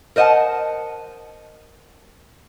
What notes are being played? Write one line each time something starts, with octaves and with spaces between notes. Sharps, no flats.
A#4 C5 D#5 E5 F#5 A5